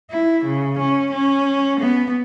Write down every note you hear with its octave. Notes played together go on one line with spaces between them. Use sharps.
E4
C#3
C#4
C#4
B3